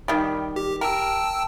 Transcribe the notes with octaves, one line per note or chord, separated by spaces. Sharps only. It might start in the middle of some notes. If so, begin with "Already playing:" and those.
D#3 G3
G4
A#4 G5 A5 E6